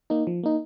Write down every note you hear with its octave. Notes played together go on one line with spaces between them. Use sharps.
A#3 D#4
F3
A#3 D#4